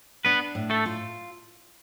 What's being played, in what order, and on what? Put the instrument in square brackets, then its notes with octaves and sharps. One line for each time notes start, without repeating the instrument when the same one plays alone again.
[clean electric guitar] B3 B4 [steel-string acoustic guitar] D4
[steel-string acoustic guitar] A2
[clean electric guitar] A3 A4
[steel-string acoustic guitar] F4